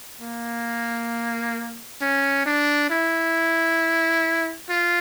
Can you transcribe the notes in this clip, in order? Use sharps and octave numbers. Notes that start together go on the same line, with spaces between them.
A#3
C#4
D4
E4
F4